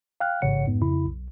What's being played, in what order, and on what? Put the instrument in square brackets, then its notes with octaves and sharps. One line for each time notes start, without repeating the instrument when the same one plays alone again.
[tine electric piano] F5 G5 F6 F#6
A1 G#2 C#3 C#5 F#5 C#7
F2 G#2 B3
F2 C#3 E4 B5
B1